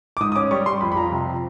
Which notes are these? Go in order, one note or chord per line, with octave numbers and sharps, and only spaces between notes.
D6
G#2 D#6
D#6
C#4 D6
G3 C#6
G3 C6
F2 B5
B5
F3 A#5
C3